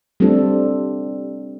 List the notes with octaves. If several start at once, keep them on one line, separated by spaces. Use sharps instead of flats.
G3 A3 C4 D4 A4